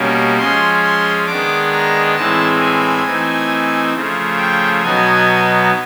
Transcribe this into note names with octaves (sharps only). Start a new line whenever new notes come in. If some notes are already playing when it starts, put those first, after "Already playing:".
Already playing: B2 G3 A#3 C#4
F3 G#3 C#4 C6
C6
D#3 G#3 B3 D4 D6
A#5
A2 E3 G#3 C4 A5
G#5
E3 A3 C4 D#4
C#3 F3 A3
G5
B2 F#3 B3 D#4 G#5